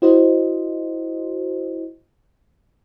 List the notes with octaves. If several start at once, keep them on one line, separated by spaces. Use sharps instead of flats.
E4 F#4 C5 D#5